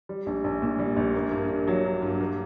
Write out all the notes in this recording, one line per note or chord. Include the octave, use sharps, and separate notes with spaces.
G3
A#1
A#1
A#2
G3
A#1
A#3
G2
G2
F#3
A#3
G2
A#3